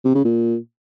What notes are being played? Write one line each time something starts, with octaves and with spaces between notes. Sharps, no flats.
C3
C#3
A#2